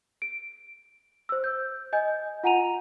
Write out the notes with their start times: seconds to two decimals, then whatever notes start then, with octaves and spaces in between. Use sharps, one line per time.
0.22 D7
1.29 C5 E6
1.44 G6
1.93 D#5 G#5 G6
2.44 F4 F#5 G#5 A#5 D#7 F7